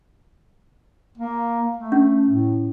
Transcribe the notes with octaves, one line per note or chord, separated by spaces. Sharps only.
A#3
A3
C#4
A2